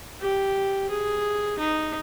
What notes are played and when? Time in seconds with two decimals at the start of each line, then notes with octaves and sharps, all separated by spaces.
0.21 G4
0.90 G#4
1.58 D#4